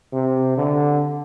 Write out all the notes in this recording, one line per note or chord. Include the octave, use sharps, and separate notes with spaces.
C3
D3